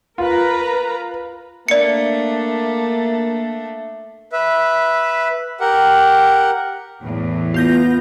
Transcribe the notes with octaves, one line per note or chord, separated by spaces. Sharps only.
F4 A#4 B4 A#5
A3 A#3 D4 D5 C#7
B4 E5
G4 A#4 F#5
E2 A2
B3 F4 G6 A#6